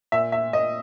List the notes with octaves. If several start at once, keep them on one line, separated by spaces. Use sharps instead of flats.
A#2 E5
E5
A#2 D#5